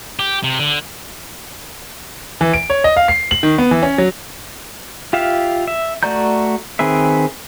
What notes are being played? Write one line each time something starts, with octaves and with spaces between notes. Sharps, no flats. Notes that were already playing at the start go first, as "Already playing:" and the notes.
G4
C3
D3
E3
D7
C#5
D#5
F5
C7
F#7
D#3
B3
E3
C#4
F#3
F4 G4 E5 F5
E5
A3 F#4 D5 A#5 G6
D#3 C4 G#4 B4 E5